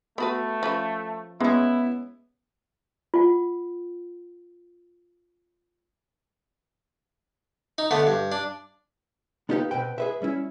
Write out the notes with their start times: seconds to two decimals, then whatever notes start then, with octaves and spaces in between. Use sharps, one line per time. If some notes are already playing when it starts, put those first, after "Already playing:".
0.18 A3 B3 F#4 B4
0.63 F3 C#4 B4
1.40 G#3 B3 C#4 E4
3.14 F4 F#5
7.78 D#4
7.91 D3 A3 B3
8.07 G2
8.32 D4
9.49 B3 D#4 F4 G4 B4 F5
9.71 B2 C4 B4 G5
9.98 G#4 B4 E5
10.22 G3 C#4 E4